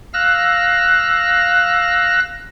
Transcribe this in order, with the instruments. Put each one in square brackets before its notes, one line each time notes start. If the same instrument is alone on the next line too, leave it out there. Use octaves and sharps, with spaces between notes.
[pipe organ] F5 E6 F#6 A#6